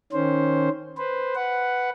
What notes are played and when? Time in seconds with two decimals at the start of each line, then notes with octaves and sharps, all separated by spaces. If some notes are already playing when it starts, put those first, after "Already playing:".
0.13 D#3 C#4 C5
0.97 B4 C5
1.35 B4 F#5